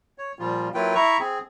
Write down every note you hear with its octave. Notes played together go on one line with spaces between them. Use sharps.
C#5
A#2 F3 G3 F4
F#3 A#3 E4 F4 B4 G5
E4 E5 A#5 C#6
C4 G#4